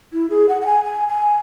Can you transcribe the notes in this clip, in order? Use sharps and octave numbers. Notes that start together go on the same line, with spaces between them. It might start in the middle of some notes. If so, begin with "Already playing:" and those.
E4
G#4
F#5
F#5
G#5
G#5
G#5